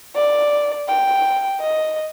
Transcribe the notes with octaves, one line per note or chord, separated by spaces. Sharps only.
D5
G5
D#5